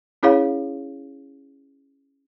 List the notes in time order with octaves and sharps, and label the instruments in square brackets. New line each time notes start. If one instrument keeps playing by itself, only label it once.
[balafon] C#4 E4 G#4 C#5 F5